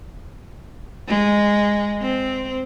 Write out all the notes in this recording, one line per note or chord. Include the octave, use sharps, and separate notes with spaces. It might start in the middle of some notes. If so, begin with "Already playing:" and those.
G#3
C4